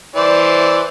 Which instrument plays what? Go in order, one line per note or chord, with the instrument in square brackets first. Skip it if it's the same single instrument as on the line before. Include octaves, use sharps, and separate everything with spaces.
[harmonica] E3 C5 D5